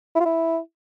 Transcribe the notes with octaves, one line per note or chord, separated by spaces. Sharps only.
E4
F4
E4